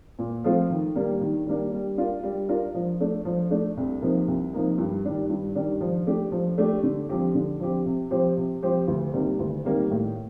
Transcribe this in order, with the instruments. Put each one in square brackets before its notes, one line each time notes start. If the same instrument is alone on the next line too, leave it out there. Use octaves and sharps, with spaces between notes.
[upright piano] A#2
F3 A3 C4 F4
D#3
G3 A#3 D4
D#3
G3 A#3 D4
G3
D4 F4 A#4
G3
D4 F4 A#4
F3
A3 D4
F3
A3 D4
C2
C3 F3 A#3 D#4
C2
C3 F3 A#3 D#4
G2
D#3 G3 D4
G2
D#3 G3 D4
F3
A3 D4 G4
F3
A3 D4 G4
D3
F3 C4 G4
D3
F3 C4 G4
C3
F3 C4 G4 C5
C3
F3 C4 G4 C5
D2
C3 D#3 G3 A#3
D2
C3 D#3 G3 A#3
A2